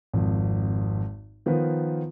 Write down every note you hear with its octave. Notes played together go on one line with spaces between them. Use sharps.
G#1 F2
D#3 F3 B3 A#4 B4